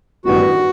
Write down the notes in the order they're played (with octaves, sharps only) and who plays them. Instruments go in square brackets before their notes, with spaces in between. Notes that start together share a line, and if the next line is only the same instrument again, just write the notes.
[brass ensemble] A1 G2 D#3 G3 B3 [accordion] F#4